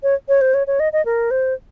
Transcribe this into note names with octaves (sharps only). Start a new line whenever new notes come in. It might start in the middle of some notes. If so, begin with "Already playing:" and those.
C#5
C#5
C5
C#5
C#5
D#5
D#5
A#4
C5